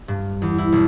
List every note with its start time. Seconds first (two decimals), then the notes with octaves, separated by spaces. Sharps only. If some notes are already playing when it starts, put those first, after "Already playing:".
0.08 G2
0.42 E2
0.58 E4
0.72 B1